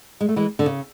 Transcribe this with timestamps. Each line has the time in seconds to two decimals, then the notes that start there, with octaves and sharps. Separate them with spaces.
0.21 G#3
0.29 A3
0.36 E3 G#3
0.59 D3
0.66 C#3